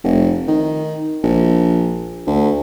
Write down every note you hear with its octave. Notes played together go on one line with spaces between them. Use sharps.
F1
D#3
A#1
D2